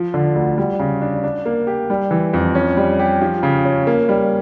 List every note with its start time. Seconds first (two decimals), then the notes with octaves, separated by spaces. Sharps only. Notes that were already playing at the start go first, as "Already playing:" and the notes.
Already playing: F3
0.14 D3
0.35 D2
0.58 G3
0.79 C#3
1.01 D4
1.24 D4
1.45 A#3
1.67 G4
1.90 G3
2.11 E3
2.33 F2
2.55 C#4
2.77 G3
2.99 G4
3.22 F3
3.43 C#3
3.65 C#4
3.87 A#3
4.09 G3